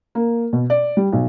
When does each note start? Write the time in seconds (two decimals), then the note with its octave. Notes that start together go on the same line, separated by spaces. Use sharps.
0.15 A#3
0.53 B2
0.70 D5
0.97 G3
1.12 B1